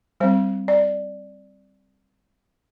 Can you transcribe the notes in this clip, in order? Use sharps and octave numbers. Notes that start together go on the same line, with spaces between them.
G3 C4 C5
D5